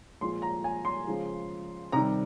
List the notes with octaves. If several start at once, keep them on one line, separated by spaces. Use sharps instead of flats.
A#2 F3 G#3 C6
A#5
G#5
C6
C#3 F3 G#3
C3 D#3 G3 A#5